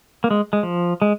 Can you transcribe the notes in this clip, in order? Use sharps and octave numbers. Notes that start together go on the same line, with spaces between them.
A#3
G#3
G#3
F3
G#3